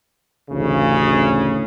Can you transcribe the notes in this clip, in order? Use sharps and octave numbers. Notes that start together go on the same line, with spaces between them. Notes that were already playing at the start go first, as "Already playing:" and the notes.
A1 D2 C#3